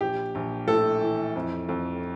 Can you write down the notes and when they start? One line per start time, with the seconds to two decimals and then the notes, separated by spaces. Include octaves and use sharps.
0.01 A#1 G4
0.35 A#1
0.68 A2 A4
1.01 E3
1.36 F2
1.69 F2